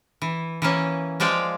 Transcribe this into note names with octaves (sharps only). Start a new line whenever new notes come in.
E3
E3 A#3 C#4
F3 G#3 D5 F5 G5